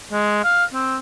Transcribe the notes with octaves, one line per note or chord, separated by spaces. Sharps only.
G#3
F5
C4